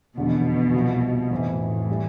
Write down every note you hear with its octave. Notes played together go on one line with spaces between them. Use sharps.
F1 E2 B2 D3
C2 C3 F3
F1 F2 A2 E3
E3 G3